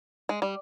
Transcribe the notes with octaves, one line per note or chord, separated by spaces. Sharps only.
G#3
G3